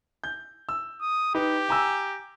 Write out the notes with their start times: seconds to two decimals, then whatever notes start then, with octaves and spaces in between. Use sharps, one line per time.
0.24 G6
0.69 E6
1.01 D#6
1.35 D#4 G4 B4
1.69 G#5 A#5 E6